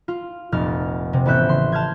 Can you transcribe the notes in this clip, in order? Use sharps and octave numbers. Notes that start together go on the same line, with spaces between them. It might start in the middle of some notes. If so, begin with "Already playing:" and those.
F4
F1 A#1 F6 A6
C3
A1 B3 C#4 E5 F#6 G6
C#3 C6
A5 F6 G6 G#6